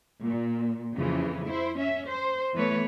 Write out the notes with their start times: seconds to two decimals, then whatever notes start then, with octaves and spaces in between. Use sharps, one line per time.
0.23 A#2
0.94 F2 C#3 E3
1.47 E4 C5
1.78 C#4 E5
2.08 C5
2.54 E3 A3 B3 B4 C#5